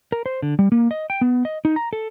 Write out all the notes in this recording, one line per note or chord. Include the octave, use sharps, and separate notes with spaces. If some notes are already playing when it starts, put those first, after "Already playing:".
A#4
C5
D3
G3
A#3
D#5
G5
B3
D#5
D#4
A#5
A4